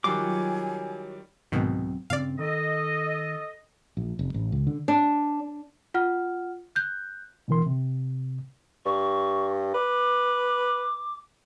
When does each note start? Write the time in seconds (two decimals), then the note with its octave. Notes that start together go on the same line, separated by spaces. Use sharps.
0.04 D#3 F#3 G3 F4 G#5 D6
1.52 C2 G#2 B2 D#3 F#3 C4
2.10 G2 C#3 C4 D5 F5
2.39 D#3 A4 D#5
3.97 A#1
4.19 F1
4.34 A1
4.52 C#2
4.67 D3
4.88 D4
5.94 F4 F#5 F6
6.76 F#6 G6
7.48 B2 D3 E3 A#4 C6
7.66 C3
8.86 G2 C#6
9.74 B4 D6